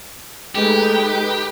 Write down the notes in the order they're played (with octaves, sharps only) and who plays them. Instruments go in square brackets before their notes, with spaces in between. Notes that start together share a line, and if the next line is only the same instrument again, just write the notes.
[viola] G#3 A3 [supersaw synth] D#4 B4 G5 [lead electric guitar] G4